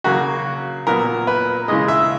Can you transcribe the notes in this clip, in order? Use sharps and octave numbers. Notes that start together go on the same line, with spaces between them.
C#3 F#3 A#3 F#4
A#2 F#3 B3 A#4
B4
C#3 E3 G#3 D#5
E5